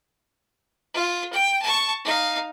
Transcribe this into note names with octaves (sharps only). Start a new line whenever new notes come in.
F4
G5
A5 C#6
D#4 F5